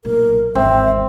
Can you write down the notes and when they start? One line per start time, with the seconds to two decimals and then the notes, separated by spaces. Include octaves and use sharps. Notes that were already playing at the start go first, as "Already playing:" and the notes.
0.05 B1 A#2 A#4
0.55 G#1 E2 C4 E5